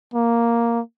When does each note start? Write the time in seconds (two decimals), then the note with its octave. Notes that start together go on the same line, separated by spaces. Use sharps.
0.14 A#3